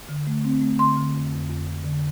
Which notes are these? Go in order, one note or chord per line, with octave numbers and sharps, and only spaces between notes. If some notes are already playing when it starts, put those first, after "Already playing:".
D3
A3
C4
A3
D3 C6
D3
F2
F2
F2
F2
D3